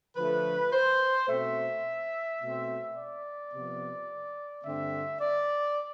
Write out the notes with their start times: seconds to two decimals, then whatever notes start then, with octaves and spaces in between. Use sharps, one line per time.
0.16 D3 F3 A3 B4
0.73 C5
1.27 B2 A3 C4 E5
2.39 B2 A3 C4
2.95 D5
3.52 C3 F3 B3
4.63 G2 D3 A3 C4 E5
5.20 D5